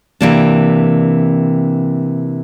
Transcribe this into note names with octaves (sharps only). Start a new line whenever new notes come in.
C3 E3 A#3 D4